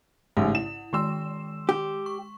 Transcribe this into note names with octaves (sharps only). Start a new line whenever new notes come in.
A1 G#2 C#3 F#5
E4 E7
D#3 G#3 C6 E6 E7
G4
C#6